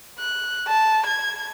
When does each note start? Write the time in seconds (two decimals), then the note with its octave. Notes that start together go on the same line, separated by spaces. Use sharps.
0.19 F#6
0.68 A5
1.07 G#6